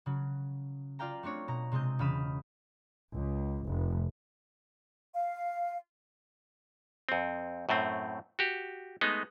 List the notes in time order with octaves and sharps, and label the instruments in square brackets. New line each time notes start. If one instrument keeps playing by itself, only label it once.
[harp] C#3 F#3
F4 D5 F5 G5 A#5
A3 C4 D4 C#5
B2 A#5
C3 G#3 C4 D#5 G6
E1 C#3 F5 B5 D#6 E7
[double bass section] C#2
F1
[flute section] F5
[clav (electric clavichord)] F2 C4
F#2 A2 A3 C4
F#4 G4
G#3 A3 B3 D#4